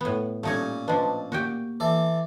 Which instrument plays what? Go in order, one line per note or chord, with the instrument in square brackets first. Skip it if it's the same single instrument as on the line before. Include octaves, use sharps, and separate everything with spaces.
[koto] A2 B3
[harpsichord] A#2 C#4 [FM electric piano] G3 [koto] A3 D#4 C#5
[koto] F3 D4 [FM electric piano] B4 D#5 A5
[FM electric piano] A#3 [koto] F#4 G4 G5
[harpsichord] E3 A4 D5